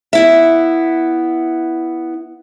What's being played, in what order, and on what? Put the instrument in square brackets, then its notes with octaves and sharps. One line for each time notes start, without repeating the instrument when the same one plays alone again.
[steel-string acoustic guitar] B3 E4 E5